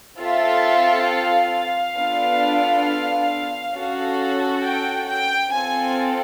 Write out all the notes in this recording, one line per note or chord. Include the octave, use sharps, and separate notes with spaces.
C4 F4 A4 E5
F5
B3 D4 F4 A4
C#4 F#4 A4
G5
G5
C4 F4 A4 G#5